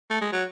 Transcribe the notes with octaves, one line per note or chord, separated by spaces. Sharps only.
A3
G#3
F#3